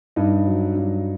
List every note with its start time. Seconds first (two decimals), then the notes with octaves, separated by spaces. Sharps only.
0.16 G2 D#4
0.46 F#3
0.76 G2